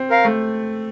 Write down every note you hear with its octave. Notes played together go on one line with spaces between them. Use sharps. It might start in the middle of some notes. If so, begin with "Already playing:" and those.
Already playing: C4
A#4 F5
A3